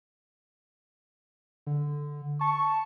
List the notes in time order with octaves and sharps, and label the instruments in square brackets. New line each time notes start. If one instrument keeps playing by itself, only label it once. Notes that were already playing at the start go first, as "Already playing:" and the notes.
[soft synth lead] D3
[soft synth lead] A5 [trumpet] C#6